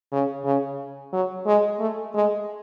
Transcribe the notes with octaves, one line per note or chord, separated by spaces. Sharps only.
C#3
C#3
F#3
G#3
A3
G#3